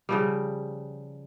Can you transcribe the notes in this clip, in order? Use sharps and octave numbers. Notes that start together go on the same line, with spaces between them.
C#3 F3 G3